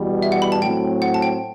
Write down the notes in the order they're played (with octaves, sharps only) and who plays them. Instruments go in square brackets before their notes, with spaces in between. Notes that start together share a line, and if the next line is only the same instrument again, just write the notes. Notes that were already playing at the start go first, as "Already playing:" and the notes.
Already playing: [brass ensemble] E2 B2 G3
[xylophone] E5
F#5
B5
A5
[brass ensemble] A2 F#3 C4 [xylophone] G5
[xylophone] F#5
A5
G5